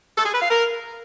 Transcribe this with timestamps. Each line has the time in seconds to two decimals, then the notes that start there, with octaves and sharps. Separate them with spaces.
0.18 A4
0.26 G#4
0.33 B4
0.41 F5
0.49 A#4